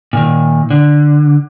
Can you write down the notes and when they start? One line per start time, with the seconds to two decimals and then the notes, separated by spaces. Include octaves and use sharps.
0.13 A#2 D#3
0.70 D3